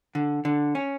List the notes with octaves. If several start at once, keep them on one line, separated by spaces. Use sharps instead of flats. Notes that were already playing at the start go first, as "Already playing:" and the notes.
D3
D3
C#4